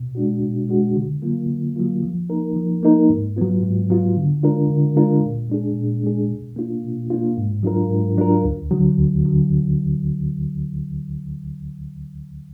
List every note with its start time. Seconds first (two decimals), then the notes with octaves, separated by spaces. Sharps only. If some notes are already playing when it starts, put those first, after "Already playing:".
Already playing: B2
0.15 G#3 D4 F#4
0.42 B2
0.69 G#3 D4 F#4
0.96 D3
1.22 F#3 A#3 F4
1.49 D3
1.76 F#3 A#3 F4
2.03 F3
2.29 A#3 D#4 A#4
2.56 F3
2.83 A#3 D#4 A#4
3.10 G#2
3.36 F#3 B3 F4
3.63 G#2
3.90 F#3 B3 F4
4.17 D3
4.43 G#3 D4 F4 A#4
4.70 D3
4.96 G#3 D4 F4 A#4
5.23 A#2
5.49 G#3 D4 G#4
5.76 A#2
6.04 G#3 D4 G#4
6.30 B2
6.56 A#3 D4 F4
6.84 B2
7.10 A#3 D4 F4
7.37 G#2
7.63 F#3 D4 F4 A#4
7.90 G#2
8.17 F#3 D4 F4 A#4
8.44 D2
8.71 D3 F#3
8.98 D2
9.25 D3 F#3